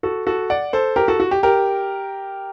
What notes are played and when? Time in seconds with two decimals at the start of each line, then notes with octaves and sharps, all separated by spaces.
0.03 F#4 A4
0.26 F#4 A4
0.50 D5 F#5
0.73 A4 C5
0.96 G4 A#4
1.08 F#4 A4
1.20 F#4
1.31 G4
1.43 G4 A#4